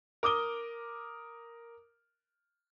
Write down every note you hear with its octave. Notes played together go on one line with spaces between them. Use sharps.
A#4 D6 D#6 G7